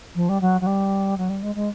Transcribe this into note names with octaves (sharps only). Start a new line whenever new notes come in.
F3
G3
F#3
F#3
G3
F#3
G3
G#3
G#3